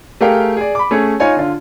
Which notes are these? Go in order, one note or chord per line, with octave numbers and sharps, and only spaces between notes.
A3 G4 G#4 A#4 F5 G5
G#4 D5
B5 D6
A3 C#4 G#4 C#5
D#4 F4 C#5 G#5
D3 F4